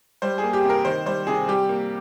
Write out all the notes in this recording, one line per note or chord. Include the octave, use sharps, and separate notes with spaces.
G3 C5
G#4
A#3
G4
C3
A#4
D#3 C5
G3 C5
C3 G#4
G3 G4
A#3